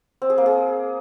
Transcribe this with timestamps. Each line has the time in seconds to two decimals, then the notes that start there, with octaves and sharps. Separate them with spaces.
0.22 C4
0.30 G#4
0.38 A#3
0.46 G#4